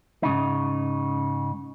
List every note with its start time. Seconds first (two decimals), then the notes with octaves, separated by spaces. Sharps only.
0.23 G#2 C#3 D#4